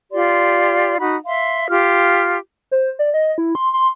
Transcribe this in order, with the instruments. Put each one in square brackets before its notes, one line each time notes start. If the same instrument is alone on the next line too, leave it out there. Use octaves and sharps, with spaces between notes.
[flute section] F4 G4 D5 C6
D#4 F#4 F#5 B5
E5 F5 C6
F4 G4 F6
[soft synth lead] C5
D5
D#5
E4
C6
C6